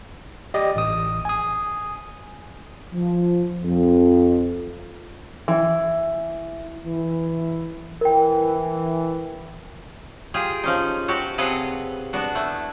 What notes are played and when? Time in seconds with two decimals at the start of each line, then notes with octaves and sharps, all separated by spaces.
0.54 G4 D5 D#5
0.76 A1 D#6
1.25 G#5 D#6
2.93 F3
3.64 F2
5.48 E3
6.86 E3 E4
8.01 E3 A#4 G5
10.34 F4 G4 G#4
10.64 F3 C#4 D#4
11.08 F#3 F#4 G4 A5
11.38 C3 F#3 G#4 A4 B4 F5
12.13 B3 D4 F#4
12.35 A3 E4